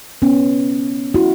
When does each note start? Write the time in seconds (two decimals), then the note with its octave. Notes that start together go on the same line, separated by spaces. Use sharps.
0.22 B3 C#4
1.14 E4 F#4